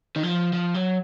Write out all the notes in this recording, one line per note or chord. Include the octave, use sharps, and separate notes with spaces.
D#3
F3
F3
F#3